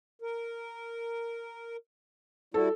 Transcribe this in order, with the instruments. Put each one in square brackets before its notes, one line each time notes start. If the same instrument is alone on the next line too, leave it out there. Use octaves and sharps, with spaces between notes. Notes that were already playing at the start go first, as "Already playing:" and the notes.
[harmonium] A#4
[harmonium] G3 E4 F#4 [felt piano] A4